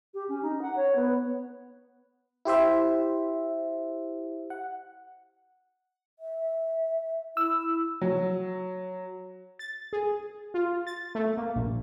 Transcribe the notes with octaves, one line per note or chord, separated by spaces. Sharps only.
G4
C#4
D#4
F#5
C#5
B3
E4 G4 C5 E5
F#5
E5
E4 E6
F#3
A6
G#4
F4
A6
A3
A#3
A#1